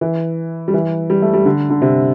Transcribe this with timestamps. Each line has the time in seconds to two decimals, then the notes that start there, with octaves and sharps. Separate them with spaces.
0.01 E3
0.68 G3
0.74 E3
1.10 G3
1.22 A3
1.34 G3
1.45 D3
1.70 D3
1.82 C3